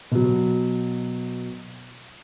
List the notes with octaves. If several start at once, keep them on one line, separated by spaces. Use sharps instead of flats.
B2 F#3